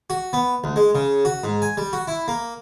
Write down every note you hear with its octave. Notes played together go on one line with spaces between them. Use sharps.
F#4
B3
D2
G#3
C#3
F#4
G#2
G#5
G3
F#4
E4
A#3